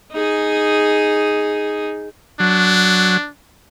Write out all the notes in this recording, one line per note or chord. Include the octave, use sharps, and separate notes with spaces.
D#4 G#4
F#3 D4